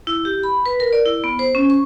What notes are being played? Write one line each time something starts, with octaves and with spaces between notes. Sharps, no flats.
E4
G4
B5
B4
A#4
D5
E4
B3
C5
C#4
C#6